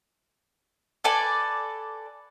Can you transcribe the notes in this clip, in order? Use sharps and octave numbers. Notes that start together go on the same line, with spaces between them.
A4 B4 D5 G#5